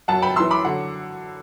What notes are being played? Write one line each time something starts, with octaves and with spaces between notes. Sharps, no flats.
F#2 F#3 F#5 A5
G5 B5
F#2 E3 C6 E6
B5 D6
D3 F#3 F#5